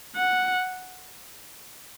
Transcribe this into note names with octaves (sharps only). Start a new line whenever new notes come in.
F#5